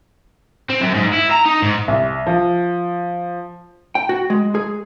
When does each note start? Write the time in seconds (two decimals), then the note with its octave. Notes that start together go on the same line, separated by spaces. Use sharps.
0.70 C4
0.81 F#2
0.95 G#2
1.14 E4
1.32 A#5
1.46 D#4
1.62 G#2
1.88 C2
2.26 F3
3.95 G5
4.09 F#4
4.30 G#3
4.55 G#4